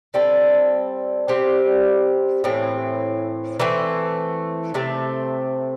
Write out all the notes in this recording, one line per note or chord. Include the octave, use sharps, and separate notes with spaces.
G3 C4 A4
G3 C4 G4 C5
A2 E3 C4
E3 A3 C4
C3 A3 C4